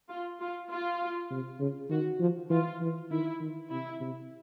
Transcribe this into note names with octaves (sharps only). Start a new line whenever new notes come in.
F4
F4
F4
C3
C#3
D#3 F#4
F3
E3 F4
E3
D#3 E4
D#3
C3 E4
C3